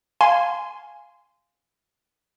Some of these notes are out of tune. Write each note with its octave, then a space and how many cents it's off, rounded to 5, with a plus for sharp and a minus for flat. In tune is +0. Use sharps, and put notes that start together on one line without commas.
F5 +0 G#5 +0 C6 -15